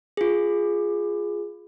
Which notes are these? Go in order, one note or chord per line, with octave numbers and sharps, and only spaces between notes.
F4 G#4